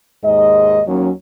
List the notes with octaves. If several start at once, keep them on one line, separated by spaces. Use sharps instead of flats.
D#2 G#2 G#3 D#5
D#2 F#3 C#4